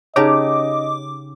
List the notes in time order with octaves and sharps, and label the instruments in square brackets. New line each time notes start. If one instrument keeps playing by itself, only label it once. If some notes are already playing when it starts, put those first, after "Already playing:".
[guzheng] C#3 G4 A#5 [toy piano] D#4 C#5 [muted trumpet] D#5 [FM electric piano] D6